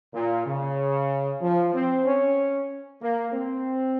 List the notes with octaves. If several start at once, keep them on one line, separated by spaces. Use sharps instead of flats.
A#2
C#3
F3
C4
C#4
A#3
C4